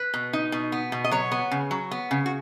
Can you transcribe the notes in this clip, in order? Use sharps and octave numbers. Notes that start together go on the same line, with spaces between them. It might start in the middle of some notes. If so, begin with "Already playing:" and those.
Already playing: B4
B2
D#4
B2
B3
B2
D#5
F#3 C#5
B3
C#3
F#3
B3
C#3
F#4